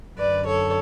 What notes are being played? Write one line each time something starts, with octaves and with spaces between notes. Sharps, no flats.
F#2 D3 B4 D5
A4 C#5